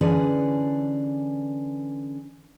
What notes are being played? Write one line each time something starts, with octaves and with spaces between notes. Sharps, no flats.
D3 E3 C#4 G#4 B4 D5